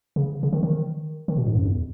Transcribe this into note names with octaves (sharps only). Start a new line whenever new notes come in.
C#3
C#3
D#3
D#3
D#3
B2
G#2
F#2
E2